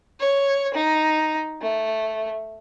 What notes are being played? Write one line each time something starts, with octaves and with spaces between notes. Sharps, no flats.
C#5
D#4
A3